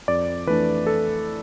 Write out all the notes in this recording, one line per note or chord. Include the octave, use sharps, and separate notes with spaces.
F2 D5
E3 A3 D4 B4
A4